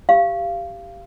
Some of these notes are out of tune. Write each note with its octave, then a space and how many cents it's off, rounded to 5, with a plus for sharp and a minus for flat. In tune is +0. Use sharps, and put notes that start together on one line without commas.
G4 +0 F5 -20